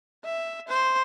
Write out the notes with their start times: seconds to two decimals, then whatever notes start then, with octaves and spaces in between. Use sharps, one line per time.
0.25 E5
0.68 C5